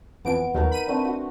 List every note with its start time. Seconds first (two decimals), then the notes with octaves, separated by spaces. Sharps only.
0.25 F2 E3 B3 D7
0.54 D#2 F3 F#3 D#4 A#4
0.71 B5 D#7
0.87 A3 C4 D4
1.05 F#4